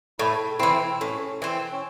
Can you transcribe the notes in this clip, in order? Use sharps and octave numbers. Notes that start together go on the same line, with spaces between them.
A2 E4
E3 C4 E4
A2 C#4
E3 C4
C#4